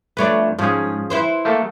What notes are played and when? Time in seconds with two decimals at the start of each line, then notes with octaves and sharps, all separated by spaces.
0.17 F2 A3 D4 B4 C#5 D5
0.59 G#2 F3 C#4 G#4
1.10 E4 B4 C5
1.45 A3 A#3 A4